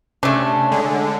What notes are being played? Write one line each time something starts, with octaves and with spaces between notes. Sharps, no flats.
C3 A3 C#4 D4
D3 G#3